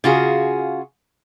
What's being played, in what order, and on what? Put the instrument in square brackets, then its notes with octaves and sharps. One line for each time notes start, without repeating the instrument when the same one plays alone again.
[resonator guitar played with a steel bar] C#3 F4 F#4 G#4